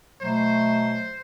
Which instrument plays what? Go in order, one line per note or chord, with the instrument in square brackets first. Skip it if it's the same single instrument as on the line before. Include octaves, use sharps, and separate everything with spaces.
[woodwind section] B2 F#3 A3 [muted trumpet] C5